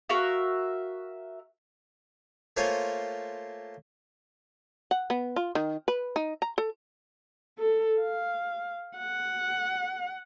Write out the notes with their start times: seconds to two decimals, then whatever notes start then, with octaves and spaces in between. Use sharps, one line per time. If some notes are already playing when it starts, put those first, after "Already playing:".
0.09 F#4 A#4 E5 F5
2.57 A3 A#3 F4 C5 C#5 G#5
4.91 F#5
5.10 B3
5.36 F4
5.55 D#3
5.88 B4
6.16 D#4
6.42 A#5
6.58 A4
7.59 A4
8.01 F5
8.98 F#5